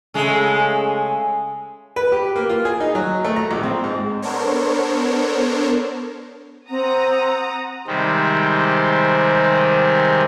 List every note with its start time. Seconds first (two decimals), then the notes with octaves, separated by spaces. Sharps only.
0.14 C#3 G#3 A3
1.96 B4
2.12 G4
2.36 A#3
2.49 F4
2.65 G#4
2.80 D#4
2.95 F#3
3.25 A3
3.36 A#5
3.51 A#1
3.63 C4
3.84 G#2
4.22 B3 D4 A4 A#4 C5 C#5
6.70 C4 F#5 A#5 D#6
7.87 C3 D#3 G3 G#3 C4